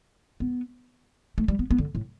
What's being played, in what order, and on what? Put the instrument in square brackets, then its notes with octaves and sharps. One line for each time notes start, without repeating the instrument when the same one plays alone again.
[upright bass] B3
A3
G3
B3
B3
D3
A2